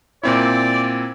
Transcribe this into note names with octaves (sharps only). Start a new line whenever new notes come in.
A#2 C4 E4 D5